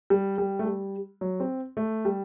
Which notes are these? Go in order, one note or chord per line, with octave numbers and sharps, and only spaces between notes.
G3
G3
A3
G3
F#3
C4
A3
G3